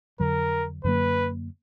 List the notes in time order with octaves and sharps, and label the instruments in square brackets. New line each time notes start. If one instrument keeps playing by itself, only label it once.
[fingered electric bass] F2 D3 F#3 [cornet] A#4
[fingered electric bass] F#2 D3 F#3 A#3 [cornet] B4